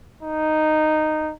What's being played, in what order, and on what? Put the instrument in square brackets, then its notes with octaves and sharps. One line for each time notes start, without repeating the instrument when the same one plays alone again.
[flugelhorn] D#4